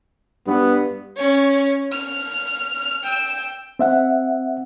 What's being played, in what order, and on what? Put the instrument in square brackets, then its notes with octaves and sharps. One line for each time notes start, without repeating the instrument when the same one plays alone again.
[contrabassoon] G2 [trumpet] B3
[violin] C#4 C#5
F6
G5 E6
[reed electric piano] C4 E5 F#5